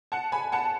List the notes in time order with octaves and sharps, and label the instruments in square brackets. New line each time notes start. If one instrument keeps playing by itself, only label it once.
[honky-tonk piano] F#5 A5
G#5 B5
F#5 A5